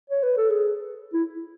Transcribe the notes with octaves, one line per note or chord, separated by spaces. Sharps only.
C#5
B4
A4
G#4
E4